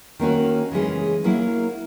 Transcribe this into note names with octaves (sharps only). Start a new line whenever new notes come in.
D#3 A#3 C#4 F#4
C#3 E3 G#3 C#4
F#3 A#3 E4 A#4